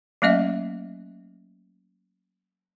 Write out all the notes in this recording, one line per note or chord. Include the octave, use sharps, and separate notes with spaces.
F#3 A3 A#3 C#4 D#5 E5